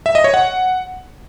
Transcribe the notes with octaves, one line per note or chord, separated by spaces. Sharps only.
E5
D#5
C#5
F#5